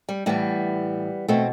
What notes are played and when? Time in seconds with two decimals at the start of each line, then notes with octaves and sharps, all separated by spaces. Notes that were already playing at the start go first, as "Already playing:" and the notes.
0.09 G3
0.26 A2 E3 G3 B3
1.28 B2 A3 C4